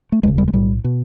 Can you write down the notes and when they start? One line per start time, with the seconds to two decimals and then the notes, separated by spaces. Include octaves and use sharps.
0.12 A3
0.23 E1 D#2 C#3 G#3
0.38 G3
0.48 G#3
0.53 B1 A2 G3
0.84 B2